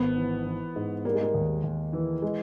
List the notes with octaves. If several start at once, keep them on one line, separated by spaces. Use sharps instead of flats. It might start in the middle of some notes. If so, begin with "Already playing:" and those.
Already playing: G#1 B3
E3
E3
G#2
G3 A#3
G#3
A#3
D#2
D#2
E3
G#3